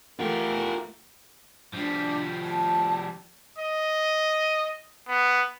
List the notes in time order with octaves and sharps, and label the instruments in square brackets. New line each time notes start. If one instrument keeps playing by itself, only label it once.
[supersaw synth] E2 A3 [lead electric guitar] F4 G4 [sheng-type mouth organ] A#4
[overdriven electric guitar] F3 G3 [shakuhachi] D4
[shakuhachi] A5
[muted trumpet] D#5
B3